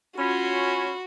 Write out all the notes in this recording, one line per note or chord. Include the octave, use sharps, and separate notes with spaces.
C#4 F4 F#4 B5 C6